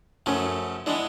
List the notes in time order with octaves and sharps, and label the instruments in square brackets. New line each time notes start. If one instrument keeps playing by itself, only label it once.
[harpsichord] F#2 C#3 F3 A3 [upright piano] C#4
[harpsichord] E3 G#3 B3 [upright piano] D4